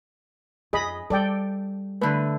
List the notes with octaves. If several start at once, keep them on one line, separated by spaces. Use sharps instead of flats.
F2 G#4 D#5 B5
G3 A4 D5 G5
D3 A3 B4